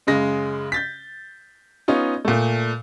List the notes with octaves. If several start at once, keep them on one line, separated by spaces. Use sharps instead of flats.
F#2 C#3 G#3 A#6
G6 A6 B6
B3 C#4 D#4 F4
A#2 A3